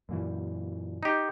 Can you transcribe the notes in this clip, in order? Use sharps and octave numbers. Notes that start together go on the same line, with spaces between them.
F#2 A#2 E3
D#4 G4